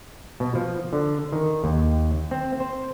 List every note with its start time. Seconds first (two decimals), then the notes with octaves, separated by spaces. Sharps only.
0.40 B2
0.55 F3
0.93 D3
1.33 D#3
1.64 D#2
2.31 C4
2.60 C5